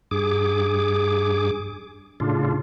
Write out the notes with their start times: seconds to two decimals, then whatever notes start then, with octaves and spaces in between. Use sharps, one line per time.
0.11 G2 G#4 D6
2.20 A2 C#3 D4 F4